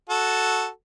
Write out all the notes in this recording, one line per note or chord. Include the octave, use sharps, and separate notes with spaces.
F#4 A4